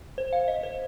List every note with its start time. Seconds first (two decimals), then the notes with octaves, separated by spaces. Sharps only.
0.18 C5
0.33 F5
0.48 D#5
0.63 C5